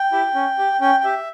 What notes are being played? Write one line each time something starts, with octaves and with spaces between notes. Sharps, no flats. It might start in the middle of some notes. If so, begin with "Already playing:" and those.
Already playing: G5
E4 G4
C#4
G4
C#4 G5
G5
G4 E5